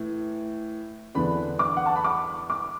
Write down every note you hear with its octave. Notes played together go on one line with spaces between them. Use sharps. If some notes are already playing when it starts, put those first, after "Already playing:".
Already playing: A2 E3
E2 D3 B3 D4 B5
D6
F#5
A5
B5
D6
D6